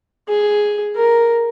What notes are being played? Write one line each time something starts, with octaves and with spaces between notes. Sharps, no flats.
G#4
A#4